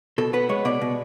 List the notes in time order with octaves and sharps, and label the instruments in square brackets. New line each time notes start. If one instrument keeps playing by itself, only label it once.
[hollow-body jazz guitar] B2 A4
B3 B4
G#3 C#5
B2 D5
B2